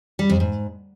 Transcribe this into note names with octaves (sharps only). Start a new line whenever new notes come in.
G3
F2
G#2